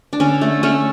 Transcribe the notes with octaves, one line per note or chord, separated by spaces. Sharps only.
D4
D3 C#4
A3
A3 C#4